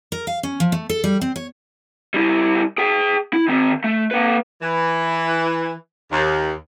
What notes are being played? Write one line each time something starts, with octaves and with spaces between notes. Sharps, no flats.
A#4
F5
C#4
F3
A3
A4
G3
C4
C#5
G3 E4
G#4 G5
E4
D#3 C4
A3
A#3 B4
E3
D#2